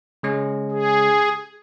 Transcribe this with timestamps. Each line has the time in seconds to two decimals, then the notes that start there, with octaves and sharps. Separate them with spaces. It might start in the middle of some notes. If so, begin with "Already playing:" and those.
0.23 C#3 G#3 C#4
0.71 G#4